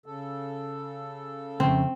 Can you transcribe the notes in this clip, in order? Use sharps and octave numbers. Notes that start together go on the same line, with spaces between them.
C#3 A4
F2 C#3 A3 C4